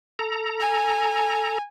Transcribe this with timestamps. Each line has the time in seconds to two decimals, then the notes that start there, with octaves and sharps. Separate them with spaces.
0.19 A4 A#5
0.60 G#5